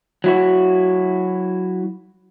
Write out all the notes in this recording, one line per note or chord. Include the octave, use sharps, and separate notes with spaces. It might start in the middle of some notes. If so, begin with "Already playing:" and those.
F#3 E4 F#4